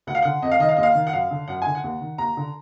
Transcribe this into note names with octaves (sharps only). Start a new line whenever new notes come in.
D2 F#5
F5
D3 F#5
F2 D#5
F5
D#3 D#5
F5
D#2 D#5
F5
D#3
F#5
F#2 F5
D3
F#2 F#5
D3 G#5
F#5
D#2
D#3
D#2 A#5
D3